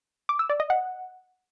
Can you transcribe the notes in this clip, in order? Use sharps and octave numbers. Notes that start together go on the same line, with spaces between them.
D6
E6
D5
D#5
F#5